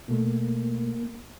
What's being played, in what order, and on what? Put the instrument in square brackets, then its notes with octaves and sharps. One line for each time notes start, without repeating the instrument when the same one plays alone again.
[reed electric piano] B2 A3 [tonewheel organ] A#3